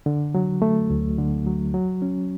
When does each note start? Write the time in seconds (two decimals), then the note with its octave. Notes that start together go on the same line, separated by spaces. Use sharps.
0.06 D3
0.35 F#3
0.62 A3
0.90 D2
1.18 D3
1.46 F#3
1.74 F#3
2.02 C#4